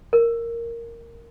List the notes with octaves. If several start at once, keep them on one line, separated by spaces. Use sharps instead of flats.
A#4